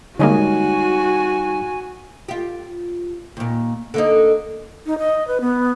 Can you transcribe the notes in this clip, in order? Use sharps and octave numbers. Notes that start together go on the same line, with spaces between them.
D3 G3 G#3 A#3 D#4 F#4 C#5 G#5
F4 G4
D#2 A#2
D3 A#3 D#4
D#4
D#5
B4
B3